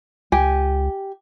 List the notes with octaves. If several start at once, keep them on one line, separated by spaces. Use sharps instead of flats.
C#2 G4 G#5